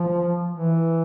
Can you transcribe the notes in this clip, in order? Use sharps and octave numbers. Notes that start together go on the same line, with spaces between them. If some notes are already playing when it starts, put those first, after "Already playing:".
Already playing: F3
E3